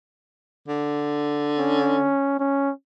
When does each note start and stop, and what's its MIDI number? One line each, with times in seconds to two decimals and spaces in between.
0.68 2.12 50
1.58 2.36 61
2.40 2.71 61